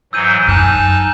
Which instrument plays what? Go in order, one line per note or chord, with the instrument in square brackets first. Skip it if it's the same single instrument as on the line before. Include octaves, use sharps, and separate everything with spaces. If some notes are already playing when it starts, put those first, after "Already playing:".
[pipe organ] G#2 E3 F#3 [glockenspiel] E6 G6 D#7
[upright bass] F#2 [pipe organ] D#4 A5 F#6 [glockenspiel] G#5 F6